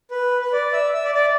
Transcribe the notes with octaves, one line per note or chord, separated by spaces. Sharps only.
B4
B4
D5
E5
E5
D5
D5